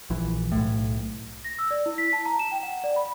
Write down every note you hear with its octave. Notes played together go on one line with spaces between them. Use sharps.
A#1 E3
B1 A2
A#6
E6
D5
E4
B6
A5
A#5
E7
G5
F#5
D5
B5